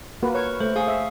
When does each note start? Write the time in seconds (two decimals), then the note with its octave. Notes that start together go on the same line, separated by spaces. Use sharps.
0.23 A#3 F#4 B4
0.34 B4 C#5 C#6 F6
0.60 A3 C5
0.76 G#4 F5 C#6 D#6
0.88 E5